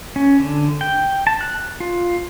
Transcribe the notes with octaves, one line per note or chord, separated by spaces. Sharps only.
C#4
D3
G5
A5
F#6
F4